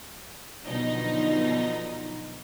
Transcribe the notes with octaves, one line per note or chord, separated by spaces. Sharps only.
B2 D3 F3 F#3 D#4